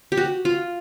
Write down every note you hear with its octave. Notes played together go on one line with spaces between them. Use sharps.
G4
F#4
F4